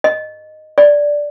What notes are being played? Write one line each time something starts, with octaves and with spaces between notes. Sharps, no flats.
D#5
D5